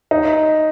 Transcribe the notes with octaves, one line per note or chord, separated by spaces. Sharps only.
D#4